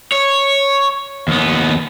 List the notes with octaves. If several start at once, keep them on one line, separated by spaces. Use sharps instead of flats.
C#5
D#2 B3